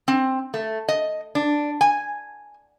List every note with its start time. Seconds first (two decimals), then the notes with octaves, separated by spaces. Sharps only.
0.08 C4
0.54 A3
0.89 D#5
1.35 D4
1.81 G#5